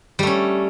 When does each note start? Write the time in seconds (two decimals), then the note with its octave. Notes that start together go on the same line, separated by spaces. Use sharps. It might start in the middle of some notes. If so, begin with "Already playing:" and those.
0.19 G3
0.23 A3
0.27 C#4